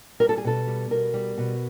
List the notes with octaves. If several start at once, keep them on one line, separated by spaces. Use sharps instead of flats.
G3 A#4
A4
G#4
B2 A4
G3
B2 A#4
G3
B2